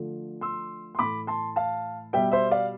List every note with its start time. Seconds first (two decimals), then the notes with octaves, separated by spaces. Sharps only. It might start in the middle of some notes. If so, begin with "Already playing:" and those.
Already playing: D3 F3 A3
0.41 C6 E6
0.95 C6
0.99 A2 E3 A3 B5 D6
1.27 A5 C6
1.56 F5 A5
2.13 B2 G3 E5 G5
2.32 C5 E5
2.51 D5 F5